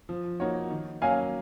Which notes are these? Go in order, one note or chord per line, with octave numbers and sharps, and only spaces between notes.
F3
A#3 D#4 F#4 C#5
D#3
F#3 A#3 C#4 F5 G#5